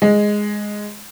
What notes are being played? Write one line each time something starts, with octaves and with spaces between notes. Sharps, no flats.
G#3